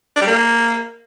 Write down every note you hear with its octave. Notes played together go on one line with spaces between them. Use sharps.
D4
G3
A#3